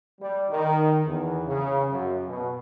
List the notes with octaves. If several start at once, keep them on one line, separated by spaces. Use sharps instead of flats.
G3
D#3
E2
C#3
F#2
B2